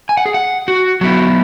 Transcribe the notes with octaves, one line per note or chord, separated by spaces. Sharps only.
G#5
F#5
G#4
F#5
F#4
F#3 B3 E4 F#4